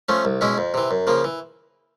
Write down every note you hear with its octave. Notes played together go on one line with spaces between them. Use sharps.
F3 A3 C#4
C2
B2 G#3 C#4 E4
F2
C3 E3
F#2
C#3 F3 A#3
E3